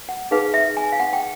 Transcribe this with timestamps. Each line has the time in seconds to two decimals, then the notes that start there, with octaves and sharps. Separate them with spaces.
0.09 F#5
0.31 D#4 G#4 B4 F5
0.54 E5
0.77 G#5
0.92 F5
1.00 F#5
1.13 G5